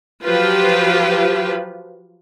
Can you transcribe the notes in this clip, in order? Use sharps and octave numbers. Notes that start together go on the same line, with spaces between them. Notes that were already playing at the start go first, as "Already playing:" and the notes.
F3 F#3 F4 G4 B4